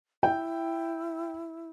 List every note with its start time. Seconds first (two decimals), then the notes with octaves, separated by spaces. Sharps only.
0.23 E4 G5